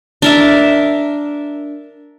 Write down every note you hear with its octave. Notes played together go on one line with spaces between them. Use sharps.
D4 A#4 E5